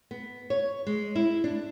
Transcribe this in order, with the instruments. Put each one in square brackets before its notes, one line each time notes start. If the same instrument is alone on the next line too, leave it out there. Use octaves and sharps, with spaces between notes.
[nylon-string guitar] B3
C#5
G#3
E4
D4